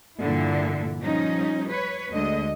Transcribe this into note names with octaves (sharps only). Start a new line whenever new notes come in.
G2 A#2 D3 E3 E4
F3 G3 C#4 D#4
B4 C#5
D2 D3 G#3 D#5